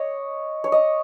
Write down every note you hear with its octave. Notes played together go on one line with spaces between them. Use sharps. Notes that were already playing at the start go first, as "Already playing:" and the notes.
Already playing: C#5 D#5
C#5
D#5